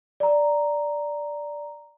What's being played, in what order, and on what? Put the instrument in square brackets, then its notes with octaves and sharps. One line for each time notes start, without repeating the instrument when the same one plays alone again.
[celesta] D5 A#5